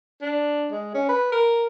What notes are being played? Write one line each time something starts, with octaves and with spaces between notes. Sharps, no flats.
D4
G#3
C#4
B4
A#4